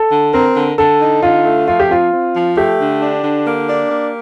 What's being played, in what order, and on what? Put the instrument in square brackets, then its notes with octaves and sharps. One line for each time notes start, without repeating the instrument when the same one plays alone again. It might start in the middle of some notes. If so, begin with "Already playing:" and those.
Already playing: [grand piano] A4
[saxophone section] D3
[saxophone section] C4 [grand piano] A#4
[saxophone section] D3
[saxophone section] D3 [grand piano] A4
[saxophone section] D#4
[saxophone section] D3 [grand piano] F4
[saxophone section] A3
[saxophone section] F3 [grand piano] F4
[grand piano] G4
[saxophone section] C4 [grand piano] F4
[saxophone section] C4
F3
[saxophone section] A3 [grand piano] G4
[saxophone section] D3
D4
D3
A#3
D4
A#3